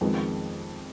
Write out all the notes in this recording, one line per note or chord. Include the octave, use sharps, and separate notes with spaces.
F2 D#3 G#3 B3